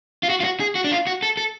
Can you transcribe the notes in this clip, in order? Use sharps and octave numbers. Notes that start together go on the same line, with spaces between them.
F4
F#4
F4
F#4
G#4
F#4
D4
F4
F#4
A4
A4